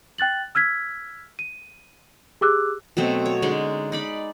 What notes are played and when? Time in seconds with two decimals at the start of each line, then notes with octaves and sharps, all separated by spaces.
0.18 G5 F#6 A6 F#7
0.55 E6 F6 G#6 B6
1.39 D#7
2.41 G4 G#4 D6 E6 F#6
2.97 B2 F#3 A3 C4
3.26 C#5
3.42 D3 G#3 C#4 D#4
3.92 D#4 D5 B5